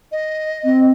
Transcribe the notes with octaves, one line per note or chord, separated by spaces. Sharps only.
D#5
C4